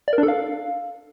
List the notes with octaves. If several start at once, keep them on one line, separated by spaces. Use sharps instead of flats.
D5
A#4
D4
A4
F5